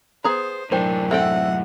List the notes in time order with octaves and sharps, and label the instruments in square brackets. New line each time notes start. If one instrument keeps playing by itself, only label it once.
[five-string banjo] B3 G#4 A#5 [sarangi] C5
[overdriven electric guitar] F#2 A2 [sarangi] D4 [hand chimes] A#4 G5 [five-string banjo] C5
[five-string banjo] C4 A4 G5 [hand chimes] E5 [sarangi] F#5